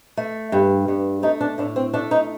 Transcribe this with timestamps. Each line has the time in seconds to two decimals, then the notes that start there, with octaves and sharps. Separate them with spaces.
0.17 A3
0.52 G2
0.88 G2
1.23 A3 D#4
1.41 D4
1.58 A2 D4
1.76 C4
1.94 A3 D4
2.11 D#4